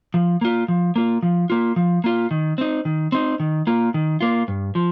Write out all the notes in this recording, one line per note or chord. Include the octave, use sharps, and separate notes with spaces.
F3
A#3 F4
F3
A#3 F4
F3
A#3 F4
F3
A#3 F4
D#3
C4 D#4
D#3
C4 D#4
D#3
A#3 F4
D#3
A#3 F4
G2
F3